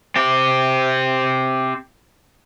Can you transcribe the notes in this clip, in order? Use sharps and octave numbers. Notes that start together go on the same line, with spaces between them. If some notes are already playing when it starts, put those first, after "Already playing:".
C4 G4